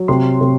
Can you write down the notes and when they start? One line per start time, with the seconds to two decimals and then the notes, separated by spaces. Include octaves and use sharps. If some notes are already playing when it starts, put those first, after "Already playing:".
Already playing: F#3
0.08 C3 C6
0.41 C3